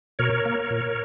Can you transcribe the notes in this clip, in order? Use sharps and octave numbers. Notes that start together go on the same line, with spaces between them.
B2 A#4 C#5
A#3
A#2